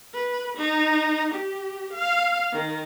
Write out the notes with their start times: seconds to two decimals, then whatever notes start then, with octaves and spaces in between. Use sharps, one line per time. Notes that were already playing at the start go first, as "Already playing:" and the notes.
0.14 B4
0.57 D#4
1.34 G4
1.92 F5
2.52 D#3